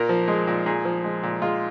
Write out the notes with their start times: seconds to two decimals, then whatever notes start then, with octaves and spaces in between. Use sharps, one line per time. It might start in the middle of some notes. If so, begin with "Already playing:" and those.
Already playing: A#2 A#4
0.09 F3
0.28 G#3
0.47 A#2
0.66 A#2 G#4
0.85 F3
1.04 G#3
1.23 A#2
1.42 G#3 F4